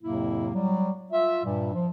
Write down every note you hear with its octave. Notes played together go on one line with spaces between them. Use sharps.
F2 A2 C3 F#3 A#3 E4
F#3 G3
F4 E5
G2 A#2 G3
F3